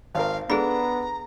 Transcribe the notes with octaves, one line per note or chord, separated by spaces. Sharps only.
G#1 A#4 F5
B3 D4 G#4 A4 A#5 B5